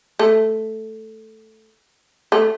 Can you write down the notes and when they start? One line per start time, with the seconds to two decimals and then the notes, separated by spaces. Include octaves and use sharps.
0.19 A3
2.32 A3